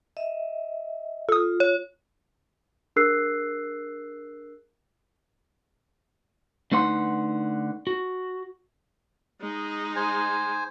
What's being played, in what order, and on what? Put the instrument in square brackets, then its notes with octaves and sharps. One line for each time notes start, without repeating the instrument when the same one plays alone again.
[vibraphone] D#5 E5
[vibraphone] F4 [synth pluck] A4 D#6
[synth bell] C#5
[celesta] D4 G#4 A#4 E6 F#6 C7
[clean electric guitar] D3 A3 D#4 B4 F#5 C6
F#4
[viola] G#3 D#4
[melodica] C5 G#5